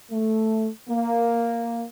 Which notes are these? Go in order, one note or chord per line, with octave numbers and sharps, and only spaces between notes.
A3
A#3